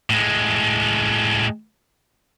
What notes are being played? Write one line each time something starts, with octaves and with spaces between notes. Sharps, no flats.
A2 G#3